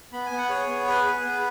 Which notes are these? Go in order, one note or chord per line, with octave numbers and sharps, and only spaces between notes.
B3 B5
G#5
B3
F#5
G#4 C#5
B3
G#4 B4
G#4
B3